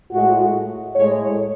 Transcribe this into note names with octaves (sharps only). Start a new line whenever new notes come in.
A2 G#3 F#4
A2 G#3 C#5